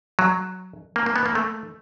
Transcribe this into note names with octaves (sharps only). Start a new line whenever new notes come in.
F#3
A#3
A#3
B3
A#3
A3